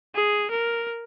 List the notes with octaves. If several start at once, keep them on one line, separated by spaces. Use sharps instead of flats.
G#4
A#4